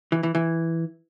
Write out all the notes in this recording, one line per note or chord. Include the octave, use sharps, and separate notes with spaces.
E3
E3
E3